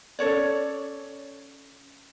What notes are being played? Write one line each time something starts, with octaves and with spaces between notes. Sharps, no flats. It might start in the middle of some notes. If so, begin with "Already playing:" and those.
C#4 A4 C#5 D5